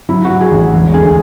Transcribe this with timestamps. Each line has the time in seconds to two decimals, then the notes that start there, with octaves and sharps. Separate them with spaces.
0.09 F#3 E4
0.25 F#4
0.30 F#3
0.41 G#4
0.52 A1
0.73 E1
0.94 D2 G#4